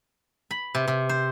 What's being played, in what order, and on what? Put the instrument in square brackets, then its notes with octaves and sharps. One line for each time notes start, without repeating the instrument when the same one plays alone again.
[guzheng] B5
C3
C3
C5